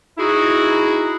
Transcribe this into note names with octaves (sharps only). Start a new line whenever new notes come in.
D#4 E4 F#4 G#4